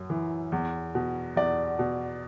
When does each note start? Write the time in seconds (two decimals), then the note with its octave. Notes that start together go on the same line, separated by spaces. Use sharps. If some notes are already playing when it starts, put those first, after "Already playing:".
Already playing: F#2
0.10 E3
0.52 E2
0.95 B2
1.36 E2 D5
1.79 B2